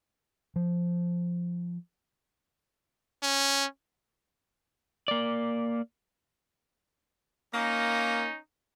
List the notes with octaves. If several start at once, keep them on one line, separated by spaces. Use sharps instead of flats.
F3
C#4
A#3 D5
A#3 C#4 D#4